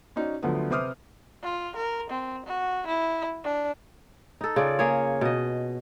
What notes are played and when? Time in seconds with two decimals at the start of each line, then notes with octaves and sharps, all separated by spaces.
0.16 C#4 D#4 F#4 D5
0.43 D2 D3 F3 F#3 A3 B3
0.70 C3 B4 C5 D6 D#6 F6
1.43 F4
1.76 A#4
2.10 C4
2.46 F#4
2.87 E4
3.44 D4
4.41 D#4 A4
4.56 C#3 F4 D5
4.79 A#3 G#4 C#5
5.21 B2 D#5